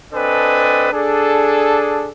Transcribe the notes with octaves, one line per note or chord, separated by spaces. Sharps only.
C4 D4 A4 B4 D#5 G#5
D4 G#4 A4